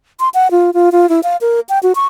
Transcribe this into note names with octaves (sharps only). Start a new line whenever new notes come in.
C6
F#5
F4
F4
F4
E4
F5
A#4
G5
F#4
C#6